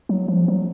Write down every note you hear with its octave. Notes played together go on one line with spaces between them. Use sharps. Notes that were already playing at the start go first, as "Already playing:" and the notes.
F#3
F3
F#3